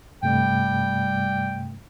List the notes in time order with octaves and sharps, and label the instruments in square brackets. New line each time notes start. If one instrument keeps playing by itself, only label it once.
[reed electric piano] G2 C3 A3 [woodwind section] G3 G5